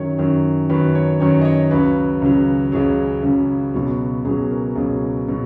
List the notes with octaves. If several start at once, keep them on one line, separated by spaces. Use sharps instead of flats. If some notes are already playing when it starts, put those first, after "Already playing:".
Already playing: F#2 D#3 F#3 C#5
F#2 D#3 F#3
F#2 D#3 F#3 B4
C#5
F#2 D#3 F#3 C#5
D#5
C#5
C#2 C#3 F#3 B4
C#2 C#3 F#3
C#2 C#3 F#3 G#4
C#2 C#3 F#3
C#2 B2 F#3
C#2 B2 F#3 G#4
A#4
C#2 B2 F#3 G#4
B2 F#3